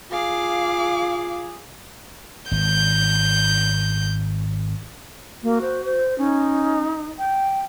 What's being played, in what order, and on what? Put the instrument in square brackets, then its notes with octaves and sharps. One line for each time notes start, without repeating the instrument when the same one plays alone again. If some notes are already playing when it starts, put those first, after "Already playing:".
[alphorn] F4 [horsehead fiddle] G#4 [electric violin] F5 D6
[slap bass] G#1 [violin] G6
[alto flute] A#3 [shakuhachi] F#4
[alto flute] C5
C5
[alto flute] C#4 [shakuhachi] D#4
[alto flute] G5